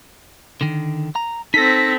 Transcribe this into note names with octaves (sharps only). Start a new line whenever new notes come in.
D3 D#3
A#5
C4 D#4 A4 A#6 B6